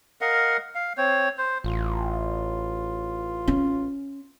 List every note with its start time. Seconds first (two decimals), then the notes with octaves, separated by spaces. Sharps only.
0.21 A#4 D#5 F5 F#5
0.75 F5
0.97 C4 C#5
1.38 C5
1.64 A1 F4
3.48 C#4